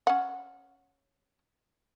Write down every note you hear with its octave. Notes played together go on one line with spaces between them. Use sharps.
C#4 F#5